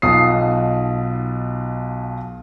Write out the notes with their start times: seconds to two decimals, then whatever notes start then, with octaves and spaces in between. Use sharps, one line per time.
0.02 B1 B2 D#4 F4 D#6 C7